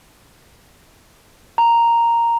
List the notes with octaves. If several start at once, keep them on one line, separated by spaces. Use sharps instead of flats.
A#5